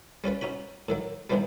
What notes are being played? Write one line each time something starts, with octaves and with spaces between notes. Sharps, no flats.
G3 C#4 F4 B4
C#4 D#4 F#4 B5
A2 D#3 F#3
G2 B2 D#3 E3 F#3 G3